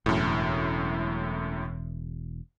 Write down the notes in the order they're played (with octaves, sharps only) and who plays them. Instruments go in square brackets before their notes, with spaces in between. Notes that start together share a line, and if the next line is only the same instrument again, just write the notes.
[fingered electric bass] E1 [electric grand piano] F#2 A2